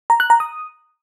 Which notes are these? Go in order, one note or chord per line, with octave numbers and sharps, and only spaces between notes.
A#5
F#6
A#5
D#6